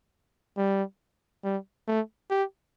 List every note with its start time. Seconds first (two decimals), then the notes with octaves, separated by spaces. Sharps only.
0.57 G3
1.44 G3
1.88 A3
2.30 G4